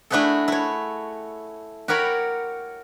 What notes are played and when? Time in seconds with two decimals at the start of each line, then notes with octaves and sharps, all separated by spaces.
0.10 A3 D4 E4 F#4 G#4 A4
0.48 E4 C#5
1.88 F#4 G4 A#4 C#5 B5